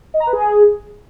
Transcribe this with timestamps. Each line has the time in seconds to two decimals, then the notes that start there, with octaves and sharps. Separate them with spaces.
0.14 D#5
0.20 A#5
0.27 B4
0.33 G#4